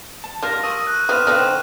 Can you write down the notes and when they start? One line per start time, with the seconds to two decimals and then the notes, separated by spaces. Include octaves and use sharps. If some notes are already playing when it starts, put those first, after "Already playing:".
0.24 A5
0.42 G3 F4 A#4
0.64 C#6 D#6 E6 D#7
0.87 F#6
1.09 B3 C4 D#6 F6 D#7 E7
1.27 D3 B3 C4 D#4 F6 F#6